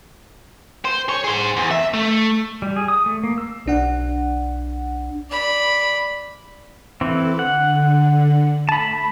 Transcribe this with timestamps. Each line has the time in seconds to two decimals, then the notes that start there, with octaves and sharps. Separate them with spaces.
0.85 C5
1.09 C#5
1.24 G#4 C5
1.57 E2
1.71 E5
1.94 A3
2.62 G3
2.76 G#4
2.88 D#6
3.06 A3
3.24 A#3
3.38 E6
3.66 B1 D4 F#5
5.30 D5 B5
7.01 E3 C4 A4
7.39 D3 F#5
8.69 A3 A5 B5